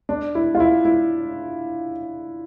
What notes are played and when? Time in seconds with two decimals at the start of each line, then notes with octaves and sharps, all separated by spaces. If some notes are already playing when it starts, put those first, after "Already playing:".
0.09 D4
0.35 E4
0.55 F4
0.60 E4
0.85 E4